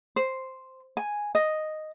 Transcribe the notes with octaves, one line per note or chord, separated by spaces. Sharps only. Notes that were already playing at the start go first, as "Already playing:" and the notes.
C5
G#5
D#5